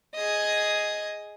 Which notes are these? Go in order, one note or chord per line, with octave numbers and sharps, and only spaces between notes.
G#4 D#5